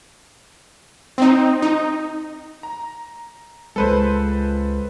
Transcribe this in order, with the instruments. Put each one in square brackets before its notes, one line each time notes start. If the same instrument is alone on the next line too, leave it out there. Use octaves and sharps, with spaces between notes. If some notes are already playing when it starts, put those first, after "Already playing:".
[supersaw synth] C4 D#4
D#4
[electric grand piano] A#5
[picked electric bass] C#2 G#3 [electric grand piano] A4 B4 C5